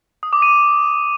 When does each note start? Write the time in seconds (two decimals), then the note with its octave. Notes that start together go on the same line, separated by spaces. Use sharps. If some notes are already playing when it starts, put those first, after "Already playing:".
0.23 D#6
0.33 D6
0.42 D#7